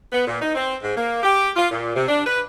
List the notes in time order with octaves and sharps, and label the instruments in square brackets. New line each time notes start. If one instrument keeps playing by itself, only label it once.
[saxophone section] B3
A#2
D#4
C4
G#2
A#3
G4
F4
A#2
C3
D4
B4